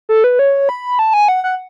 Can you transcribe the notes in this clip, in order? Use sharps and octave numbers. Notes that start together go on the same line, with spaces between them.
A4
B4
C#5
B5
A5
G#5
F#5
F#5